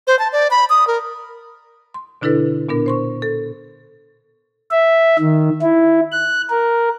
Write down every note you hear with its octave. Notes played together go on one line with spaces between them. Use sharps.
C5
A5
D5
B5
D#6
A#4
C6
B2 D3 D4 E4 A4 B4
A#2 B3 D4 A#4
C5 C6 C#6
A4
E5
D#3
E4
F#6
A#4